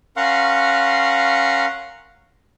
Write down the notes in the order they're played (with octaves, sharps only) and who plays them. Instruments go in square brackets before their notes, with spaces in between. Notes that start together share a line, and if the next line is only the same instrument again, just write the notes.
[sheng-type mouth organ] C#4 A#4 F5 F#5 C6 C#6